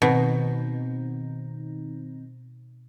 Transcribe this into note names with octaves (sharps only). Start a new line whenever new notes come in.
B2 D#3 C4 D#4